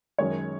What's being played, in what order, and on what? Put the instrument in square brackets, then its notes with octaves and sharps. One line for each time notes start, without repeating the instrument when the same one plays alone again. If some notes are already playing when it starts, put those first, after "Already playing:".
[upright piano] F#2 D#3 G#3 C#5